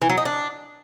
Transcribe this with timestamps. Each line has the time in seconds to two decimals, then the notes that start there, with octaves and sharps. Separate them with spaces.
0.02 E3
0.10 F#3
0.17 D#4
0.25 D4